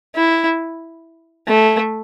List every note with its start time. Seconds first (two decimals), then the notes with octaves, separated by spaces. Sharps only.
0.15 E4
1.48 A3